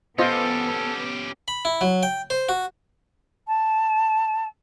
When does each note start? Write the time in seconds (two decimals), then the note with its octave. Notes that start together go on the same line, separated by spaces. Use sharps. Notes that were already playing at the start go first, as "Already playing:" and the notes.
0.19 B3 C#4 F4 G4 A4 C5 D#5
1.48 B5
1.65 E4
1.81 F#3
2.03 G5
2.30 C5
2.49 F#4
3.47 A5